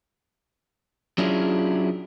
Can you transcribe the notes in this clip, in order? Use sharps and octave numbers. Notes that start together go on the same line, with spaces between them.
F#3 C#4 D4 E4 F4 G#4